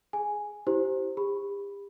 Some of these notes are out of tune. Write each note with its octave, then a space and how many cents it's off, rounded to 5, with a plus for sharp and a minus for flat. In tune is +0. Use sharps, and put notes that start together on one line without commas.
G#4 +0 G#5 +0
E4 +0 G4 -20 C5 +0
G4 +40 B5 +0